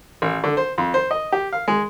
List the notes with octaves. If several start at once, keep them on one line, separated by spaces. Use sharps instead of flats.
A1
D3
C5
F2
C5
D#5
G4
F5
G#3